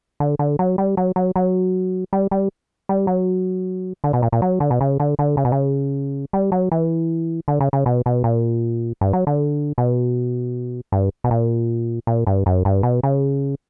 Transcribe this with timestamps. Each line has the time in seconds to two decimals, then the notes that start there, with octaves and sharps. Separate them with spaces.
0.20 D3
0.39 D3
0.59 F#3
0.78 G3
0.97 F#3
1.16 F#3
1.36 F#3
2.13 G3
2.31 G3
2.89 G3
3.07 F#3
4.04 D3
4.13 B2
4.22 A#2
4.32 A#2
4.42 F#3
4.60 D3
4.70 B2
4.81 C#3
5.00 D3
5.19 D3
5.37 C#3
5.45 B2
5.52 C#3
6.33 G3
6.52 F#3
6.72 E3
7.48 D3
7.60 C#3
7.73 C#3
7.86 B2
8.06 B2
8.24 A#2
9.01 G2
9.13 F#3
9.27 D3
9.78 B2
10.92 G2
11.24 B2
11.31 A#2
12.07 A#2
12.27 G2
12.46 F#2
12.65 G2
12.83 B2
13.03 C#3